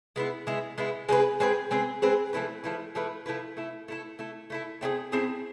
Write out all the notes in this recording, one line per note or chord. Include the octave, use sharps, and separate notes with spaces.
G#3 B3 E4
G#3 B3 E4
G#3 B3 E4
G#3 C4 G#4 B4
G#3 C4 G#4 B4
G#3 C4 G#4 B4
G#3 C4 G#4 B4
F3 A3 E4 B4
F3 A3 E4 B4
F3 A3 E4 B4
F3 A3 E4 B4
A3 E4 A4
A3 E4 A4
A3 E4 A4
A3 E4 A4
A3 C4 E4 G#4
A3 C4 E4 G#4